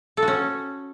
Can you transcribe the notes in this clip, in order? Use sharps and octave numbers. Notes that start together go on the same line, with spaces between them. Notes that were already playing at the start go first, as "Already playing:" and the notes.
A4
F#4
C#4